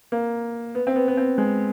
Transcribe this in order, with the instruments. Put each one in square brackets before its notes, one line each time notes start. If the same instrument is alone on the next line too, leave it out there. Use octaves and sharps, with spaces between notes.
[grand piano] A#3
B3
C4
B3
B3
C4
G#3